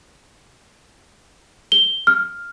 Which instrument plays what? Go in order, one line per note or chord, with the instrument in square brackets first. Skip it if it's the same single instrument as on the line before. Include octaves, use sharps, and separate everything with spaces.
[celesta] G7
F6